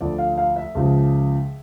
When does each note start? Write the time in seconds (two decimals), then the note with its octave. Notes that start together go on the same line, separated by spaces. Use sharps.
0.01 D2 D3 F3 D5
0.18 F5
0.38 F5
0.56 E5
0.75 C#2 C#3 F3